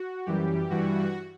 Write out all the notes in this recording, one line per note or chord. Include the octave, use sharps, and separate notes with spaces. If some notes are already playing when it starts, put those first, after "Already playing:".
Already playing: F#4
F#2 E3 G3 G4
G2 E3 G3 F#4